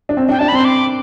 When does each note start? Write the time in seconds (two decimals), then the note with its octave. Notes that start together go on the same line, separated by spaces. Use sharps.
0.09 D4
0.17 C4
0.29 D4
0.31 G5
0.39 D4 A5
0.48 B5
0.52 C4 C6
0.65 D6